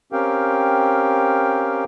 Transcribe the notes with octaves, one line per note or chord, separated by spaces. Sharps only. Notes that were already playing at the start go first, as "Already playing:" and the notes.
C4 C#4 G4 A#4 F5 G5